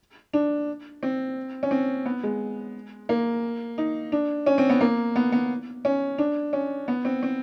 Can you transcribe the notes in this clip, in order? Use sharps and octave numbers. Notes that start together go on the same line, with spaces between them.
D4
C4
C#4
C4
B3
G#3
A#3
D#4
D4
C#4
C4
B3
A#3
B3
B3
C#4
D4
C#4
B3
C4
C4